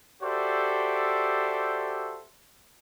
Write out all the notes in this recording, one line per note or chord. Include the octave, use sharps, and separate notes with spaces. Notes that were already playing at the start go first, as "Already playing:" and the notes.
F#4 G4 A4 C5 D5 E5